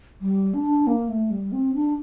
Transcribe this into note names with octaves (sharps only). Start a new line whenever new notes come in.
G3
D4
A#3
A3
G3
C4
D4